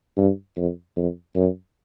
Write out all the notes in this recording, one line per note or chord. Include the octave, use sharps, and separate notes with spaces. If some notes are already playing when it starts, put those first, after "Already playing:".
G2
F2
F2
F#2